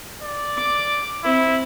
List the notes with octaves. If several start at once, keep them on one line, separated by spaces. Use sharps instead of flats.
D5
D6
C4 E4